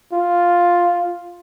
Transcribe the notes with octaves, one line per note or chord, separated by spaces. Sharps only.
F4